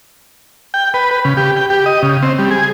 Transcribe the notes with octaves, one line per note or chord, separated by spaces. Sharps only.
G5
B4
B4
C#3
G4
G5
G4
D#5
C#3
C4
G3
G#4